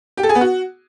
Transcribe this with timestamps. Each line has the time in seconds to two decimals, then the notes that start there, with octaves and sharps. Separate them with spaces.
0.17 G4
0.23 A4
0.29 G#4
0.35 B3
0.41 F#4